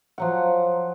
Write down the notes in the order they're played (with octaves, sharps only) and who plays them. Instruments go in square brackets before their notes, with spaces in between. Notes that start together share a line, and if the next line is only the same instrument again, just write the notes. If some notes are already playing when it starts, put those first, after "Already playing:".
[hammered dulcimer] F3 F#3 F#5